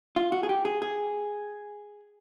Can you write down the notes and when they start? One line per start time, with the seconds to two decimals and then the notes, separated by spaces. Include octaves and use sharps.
0.16 F4
0.32 F#4
0.43 G#4
0.49 G4
0.65 G#4
0.82 G#4